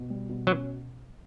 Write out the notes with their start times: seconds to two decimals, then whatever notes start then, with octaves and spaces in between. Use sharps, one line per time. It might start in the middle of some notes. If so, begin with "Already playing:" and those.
Already playing: B2
0.10 G3
0.29 B2
0.47 F#3 C#4